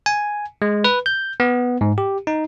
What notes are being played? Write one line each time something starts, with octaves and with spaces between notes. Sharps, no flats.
G#5
G#3
B4
G6
B3
G#2
G4
D#4